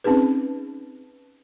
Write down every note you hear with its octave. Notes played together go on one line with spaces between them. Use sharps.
C4 C#4 D#4 G#4 B4